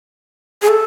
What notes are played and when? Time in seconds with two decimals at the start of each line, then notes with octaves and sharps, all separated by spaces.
0.62 G#4
0.68 A4